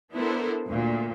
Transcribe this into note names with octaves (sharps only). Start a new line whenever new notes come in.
B3 D4 E4 A4 A#4 C5
D2 A#2